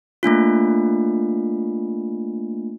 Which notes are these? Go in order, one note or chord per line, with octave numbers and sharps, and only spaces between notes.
A3 A#3 D4 F4